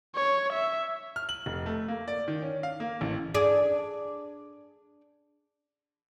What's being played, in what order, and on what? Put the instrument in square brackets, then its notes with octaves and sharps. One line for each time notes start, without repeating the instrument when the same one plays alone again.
[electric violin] C#5
E5
[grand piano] F6
F#7
F1
A3
A#3
D5
D#3
C#4
F5
A#3
A1
[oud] D4 G#4